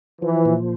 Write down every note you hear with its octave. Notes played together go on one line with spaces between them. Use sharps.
E3 F3
A#2